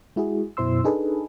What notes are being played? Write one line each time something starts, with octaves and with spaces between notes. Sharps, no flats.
G#3 E4 F#4 G#4
F#2 B2 E4 C5 C6 E6
D4 D#4 G#4 A4 B4